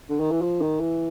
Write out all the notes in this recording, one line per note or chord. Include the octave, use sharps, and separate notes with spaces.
D3
D#3
E3
F3
D#3
E3